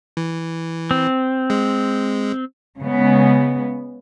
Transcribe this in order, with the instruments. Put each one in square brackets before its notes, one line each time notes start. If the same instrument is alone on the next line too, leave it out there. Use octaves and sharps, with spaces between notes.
[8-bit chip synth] E3
[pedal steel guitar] C4
[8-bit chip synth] G#3
[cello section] C#3 G#3 B3